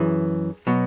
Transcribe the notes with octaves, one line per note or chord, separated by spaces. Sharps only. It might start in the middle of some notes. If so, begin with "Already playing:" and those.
Already playing: F#2 E3 G#4
B2 F#3